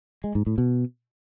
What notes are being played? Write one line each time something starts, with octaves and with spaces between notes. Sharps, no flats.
G#3
G#2
A2
B2